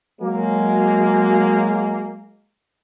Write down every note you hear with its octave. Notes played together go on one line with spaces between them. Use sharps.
F#3 G#3 A#3